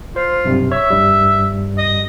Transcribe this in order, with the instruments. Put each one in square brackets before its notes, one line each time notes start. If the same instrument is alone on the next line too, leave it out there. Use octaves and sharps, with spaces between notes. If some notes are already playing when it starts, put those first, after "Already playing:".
[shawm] F4 [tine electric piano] C5
[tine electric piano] B1 G2 C3
[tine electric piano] C#5 [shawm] E5
[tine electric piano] G2 G3
[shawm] D#5